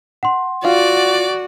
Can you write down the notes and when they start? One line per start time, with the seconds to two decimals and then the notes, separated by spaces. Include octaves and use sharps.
0.23 F#5 C6
0.65 F4 F#4 D5